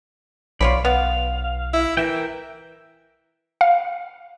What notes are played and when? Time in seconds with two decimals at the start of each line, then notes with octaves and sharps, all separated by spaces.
0.61 B1 F4 C#5 D5 B5
0.85 B3 F5
1.73 E4
1.97 E3 A#4 E5 G5
3.61 F5